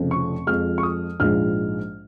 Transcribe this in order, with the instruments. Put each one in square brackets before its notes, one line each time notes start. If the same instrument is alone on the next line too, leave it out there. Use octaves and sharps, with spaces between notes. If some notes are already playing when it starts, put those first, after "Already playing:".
Already playing: [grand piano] F1 F2 C#3
C#6
F2 F3 G#3 F6
C#6
D#6
A#1 G#2 F3 G#3 F6